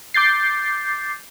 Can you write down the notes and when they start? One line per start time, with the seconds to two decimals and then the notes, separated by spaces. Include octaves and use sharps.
0.14 D6 G6 A6 C7